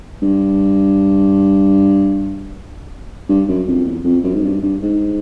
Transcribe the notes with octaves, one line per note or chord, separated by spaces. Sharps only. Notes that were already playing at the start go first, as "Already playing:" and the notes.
G2
G2
F#2
F2
E2
F2
F#2
G#2
G2
G2
G#2